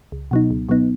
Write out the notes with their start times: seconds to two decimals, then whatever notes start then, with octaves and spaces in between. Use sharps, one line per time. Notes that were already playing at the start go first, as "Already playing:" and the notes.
0.12 C#2
0.31 B2 F#3 B3 D#4
0.51 C#2
0.69 B2 F#3 B3 D#4